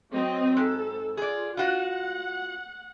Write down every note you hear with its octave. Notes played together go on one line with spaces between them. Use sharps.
F#3 C4 D#5
G#2 A4
F4 G#4 D5
F4 F#4 F#5